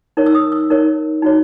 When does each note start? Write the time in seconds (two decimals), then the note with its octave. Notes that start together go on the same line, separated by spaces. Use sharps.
0.17 D#4 A#4 C#5
0.26 E6
0.35 D#6
0.52 E6
0.70 D#4 A#4 C#5
1.22 D#4 F#4 C#5